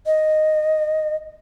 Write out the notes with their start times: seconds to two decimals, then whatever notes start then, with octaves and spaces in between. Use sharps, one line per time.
0.06 D#5